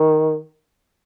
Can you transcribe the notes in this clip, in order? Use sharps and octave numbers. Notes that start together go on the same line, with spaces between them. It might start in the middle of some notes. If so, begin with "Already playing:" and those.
Already playing: D#3